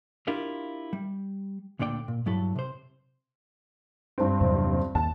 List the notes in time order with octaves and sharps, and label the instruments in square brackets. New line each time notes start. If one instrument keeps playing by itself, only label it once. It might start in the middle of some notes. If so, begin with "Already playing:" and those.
[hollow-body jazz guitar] D4 E4 F4 G4 A#4
G3
D2 A#2 D3 D5 G5
A#2
G2 F#3 E4 A4
C3 C5
[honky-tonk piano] G2 C4
[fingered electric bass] E2 C3 F#3
[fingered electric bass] D#2 [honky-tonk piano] A5